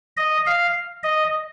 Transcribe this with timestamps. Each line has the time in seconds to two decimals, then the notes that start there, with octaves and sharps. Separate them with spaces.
0.17 D#5
0.46 F5
1.04 D#5